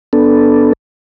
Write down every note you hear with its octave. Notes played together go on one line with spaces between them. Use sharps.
B3 D4 A4